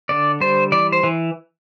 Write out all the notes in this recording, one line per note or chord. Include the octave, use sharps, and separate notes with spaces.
D3 D5
G3 C5
E3 D5
C5
E3